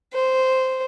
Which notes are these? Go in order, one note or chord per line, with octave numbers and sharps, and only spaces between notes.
C5